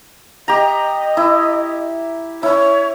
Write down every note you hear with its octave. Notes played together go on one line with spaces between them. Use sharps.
G4 D#5 A#5
E4
E4 C#5